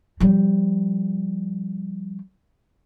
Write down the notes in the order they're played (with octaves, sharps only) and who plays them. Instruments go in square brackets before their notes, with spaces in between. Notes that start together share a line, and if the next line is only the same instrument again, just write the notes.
[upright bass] F3 G3